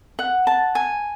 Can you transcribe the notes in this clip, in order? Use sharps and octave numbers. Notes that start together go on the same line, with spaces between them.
F#5
A5
G#5